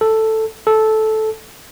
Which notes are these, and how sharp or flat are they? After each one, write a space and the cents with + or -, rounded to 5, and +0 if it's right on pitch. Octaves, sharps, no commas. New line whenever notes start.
A4 +5
A4 -10